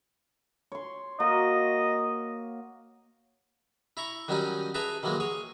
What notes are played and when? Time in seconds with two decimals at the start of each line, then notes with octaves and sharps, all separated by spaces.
0.72 C#5 C6
1.20 A#3 F#4 D#5
3.97 E4 A#5 C#6
4.28 D#3 F#3 G3 C#4 D#4
4.74 G#4 B4 E5 A5 A#5
5.03 D#3 E3 F#3 G#3 A#3
5.20 G#4 C#5